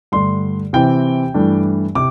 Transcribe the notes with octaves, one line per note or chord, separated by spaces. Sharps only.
G2 D3 A3 C6
C3 E3 C4 G5
G2 E3 A3 D4
C3 D6